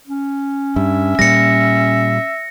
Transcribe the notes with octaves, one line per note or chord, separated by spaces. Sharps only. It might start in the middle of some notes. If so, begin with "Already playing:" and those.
C#4
G2 E5
A#2 G3 A#6 C#7